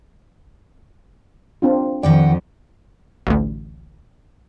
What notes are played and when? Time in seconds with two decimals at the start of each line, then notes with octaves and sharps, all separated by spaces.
1.62 C4 D4 F4
2.03 F2 D#3 D5 F#5 G5
3.27 A1 D2